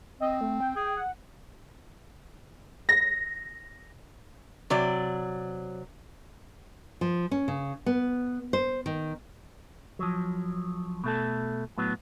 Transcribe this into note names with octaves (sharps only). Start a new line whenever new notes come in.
C4 D#5
A3
G5
G#4
F#5
A#6
C3 F#3 D5
F3
C#4
C#3
B3
C5
D#3
F3 F#3
B2 A3 A4
A2 F#3 B3